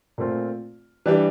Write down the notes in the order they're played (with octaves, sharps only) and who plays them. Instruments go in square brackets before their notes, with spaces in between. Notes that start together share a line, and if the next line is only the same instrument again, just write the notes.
[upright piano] A#2 A3 C4 F4
E3 G3 D4 G4